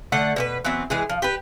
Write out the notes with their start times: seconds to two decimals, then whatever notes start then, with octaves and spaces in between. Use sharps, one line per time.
0.12 D3 A3 A4 F#5
0.36 B2 G4 B4
0.64 E3 F#3 B3 C4
0.90 E3 G#3 G#4
1.09 F3
1.22 G4 B4